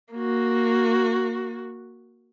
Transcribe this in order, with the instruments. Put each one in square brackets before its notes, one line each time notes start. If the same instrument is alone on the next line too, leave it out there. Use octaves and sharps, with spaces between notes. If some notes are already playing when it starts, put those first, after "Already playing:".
[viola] A#3 F#4